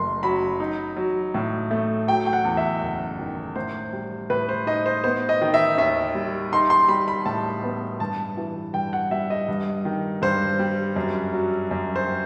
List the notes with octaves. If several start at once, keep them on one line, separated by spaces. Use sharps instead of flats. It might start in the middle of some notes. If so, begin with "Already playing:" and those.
Already playing: F#1 F#2 A3 C6
F#3 B5
D#4
F#3
A2
A3
F#3 G5
G5
F#5
E2
E5
F#1
D#3
A2 C5
G3
A2 B4
C5
D#4 D#5
C5
B3 C5
D#5
D#3
E5
D#2 E5
G3
D#4 C6
C6
G3 B5
B5
A2 A5
B3
G2 A5
E3
G2 G5
F#5
G3 E5
D#5
G2
D#3
G2 C5
G3
F#2
F#3
F#2
C5
C4